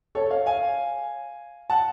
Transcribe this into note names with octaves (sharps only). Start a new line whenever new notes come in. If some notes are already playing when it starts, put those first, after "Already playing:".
A4 C#5
C#5 F5
F5 G#5
F#5 A5